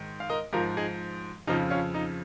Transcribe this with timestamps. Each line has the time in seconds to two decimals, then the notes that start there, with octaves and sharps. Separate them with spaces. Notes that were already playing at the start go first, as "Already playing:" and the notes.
Already playing: G#2 D#3
0.20 F5
0.30 A#4 D#5
0.53 G#2 F3 F4 A#4
0.77 D#4 G#4
1.47 F2 C#3 F3 D#4
1.70 C#4 F4
1.94 D#4